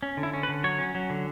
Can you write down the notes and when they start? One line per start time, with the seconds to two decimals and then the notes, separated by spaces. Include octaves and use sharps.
0.03 C#4
0.17 D3
0.23 E4
0.34 C#4
0.43 B4
0.48 D3
0.64 F#3 C#5
0.79 C#4
0.95 F#3
1.10 D3